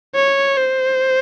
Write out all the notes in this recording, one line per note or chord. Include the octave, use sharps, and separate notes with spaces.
C#5
C5